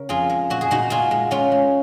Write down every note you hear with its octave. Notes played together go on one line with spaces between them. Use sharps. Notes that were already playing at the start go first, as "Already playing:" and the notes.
Already playing: C#3 A#4
F2 F4 G#4
G#3
A#2 F#4
G#4
A#2 D#4 F#4
A#2 F4 G#4
G#3
G#3 C#4 F4
G#3